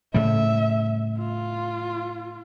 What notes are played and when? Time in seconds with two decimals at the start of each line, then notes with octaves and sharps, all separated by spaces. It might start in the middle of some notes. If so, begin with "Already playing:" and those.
0.14 A2 C#3 G3 E5
1.18 F4